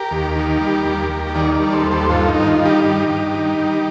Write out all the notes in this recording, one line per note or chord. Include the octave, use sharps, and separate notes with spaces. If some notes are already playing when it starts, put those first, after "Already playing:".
Already playing: G4 A#4
D#2
D#3
G3
D#2
D#2
D#3 A#4 D5
A#4 D5
G3
A4 C5
D#2
A4 C5
G2 F4 A4
D#4
D#3
F4
G3
D#4 G4
G2
G2
D#3
G3